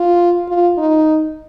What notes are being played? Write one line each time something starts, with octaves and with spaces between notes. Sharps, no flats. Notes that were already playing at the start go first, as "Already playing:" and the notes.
Already playing: F4
F4
D#4